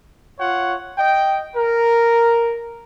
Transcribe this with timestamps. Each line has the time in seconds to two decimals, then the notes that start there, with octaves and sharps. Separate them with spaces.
0.39 F4 C#5 F#5
0.98 D#5 G5
1.56 A#4